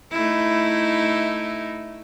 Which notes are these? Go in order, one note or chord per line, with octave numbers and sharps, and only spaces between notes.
A3 D#4 E4